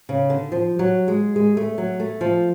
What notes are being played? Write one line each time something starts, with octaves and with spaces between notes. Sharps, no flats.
C#3
D3
F3
F#3
G#3
G#3
A3
F#3
A3
F3